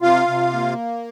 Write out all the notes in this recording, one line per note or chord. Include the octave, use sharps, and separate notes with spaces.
C3 F4 F5
C3
A#3